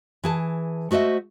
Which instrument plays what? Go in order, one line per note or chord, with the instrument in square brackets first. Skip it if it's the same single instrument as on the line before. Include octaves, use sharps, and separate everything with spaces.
[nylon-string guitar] E3 G#4 A5
A3 F#4 C5 D#5 E5